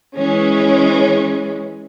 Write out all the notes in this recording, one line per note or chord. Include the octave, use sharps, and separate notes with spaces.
E3 G#3 C#4